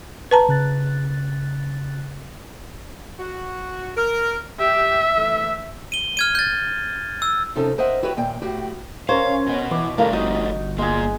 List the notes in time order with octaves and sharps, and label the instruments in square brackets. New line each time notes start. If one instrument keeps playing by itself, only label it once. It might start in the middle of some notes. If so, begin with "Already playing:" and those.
[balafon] B4 A5 A#5
[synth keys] C#3 F#6 A6
[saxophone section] F#4
A#4
[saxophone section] G4 [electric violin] E5
[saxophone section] E3 A3
[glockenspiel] D#7 G7
F6 G#6 D#7
G6 A6
E6
[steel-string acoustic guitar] C3 F3 C#4 D#4 A4
A#4 C5 D#5 E5 F#5
E4 F#4 G4 B4 C#5
D#2 A#2 G5
A2 F#4 G4
[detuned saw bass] C#4 [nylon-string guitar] A#4 C5 [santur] C#5 [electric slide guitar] F5
[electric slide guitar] B2 B3
[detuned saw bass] E3 [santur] D6
[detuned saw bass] A2 [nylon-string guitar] D3 A#4 F5 [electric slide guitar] F3 G3 A3
[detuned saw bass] G1 [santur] D#4 [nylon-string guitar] F#4 D#5
[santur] G#3 G#4 [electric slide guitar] A#3 F4